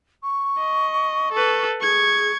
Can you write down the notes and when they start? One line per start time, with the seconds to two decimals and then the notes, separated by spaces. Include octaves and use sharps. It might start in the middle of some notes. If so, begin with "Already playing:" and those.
0.22 C#6
0.58 D#5
1.33 A4 B4
1.81 G#4 C#6 G#6